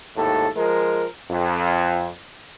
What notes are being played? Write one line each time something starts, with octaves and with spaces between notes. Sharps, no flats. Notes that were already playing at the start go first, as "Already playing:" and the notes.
G#1 D#2 A2 A4
F3 G#3 A#4
F2